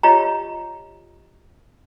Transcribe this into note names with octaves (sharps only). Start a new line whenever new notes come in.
F4 G4 C#5 D#5 A#5